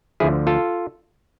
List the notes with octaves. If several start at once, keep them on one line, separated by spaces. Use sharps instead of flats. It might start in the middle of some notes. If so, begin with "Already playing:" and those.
D2 D3 F3 E4 G#4
F4 A4